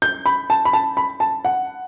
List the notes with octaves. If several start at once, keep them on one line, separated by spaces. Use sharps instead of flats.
G6
B5
A5
B5
A5
B5
A5
F#5